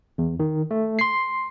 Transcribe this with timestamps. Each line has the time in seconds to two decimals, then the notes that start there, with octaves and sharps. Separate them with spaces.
0.18 E2
0.40 D#3
0.71 A3
0.99 C6 C7